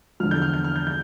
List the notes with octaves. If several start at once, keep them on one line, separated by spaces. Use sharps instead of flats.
E2 D3 F3 F6
G6
F6
G6
F6
G6
G6